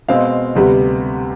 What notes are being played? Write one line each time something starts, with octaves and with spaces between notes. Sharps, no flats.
B2 G#3 C4 F5
D2 C3 G3 B3